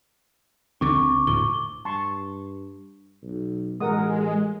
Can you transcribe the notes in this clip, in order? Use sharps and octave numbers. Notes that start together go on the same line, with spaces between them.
C#2 D3 C4 C#6 D6
D#1 D2 A2 G7
G2 A5 C6 C#6
B1
A1 G#3 A#4 F#5 D#6